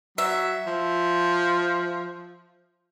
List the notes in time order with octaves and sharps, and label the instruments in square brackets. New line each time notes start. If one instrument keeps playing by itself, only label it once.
[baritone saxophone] F#3 [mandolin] E5
[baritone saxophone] F3